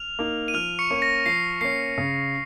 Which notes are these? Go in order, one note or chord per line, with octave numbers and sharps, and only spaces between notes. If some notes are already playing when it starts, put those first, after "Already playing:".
Already playing: F6 F7
A#3 D#4
D#7
F3 F6 F7
C#6 C#7
A#3 C#4
A#6
F3 C7
A#3 C#4 C7
C#3